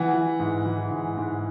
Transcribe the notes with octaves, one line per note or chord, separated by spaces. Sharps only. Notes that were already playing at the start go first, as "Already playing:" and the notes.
Already playing: E3 F#5
E3
G#2
E3
G#2
G#2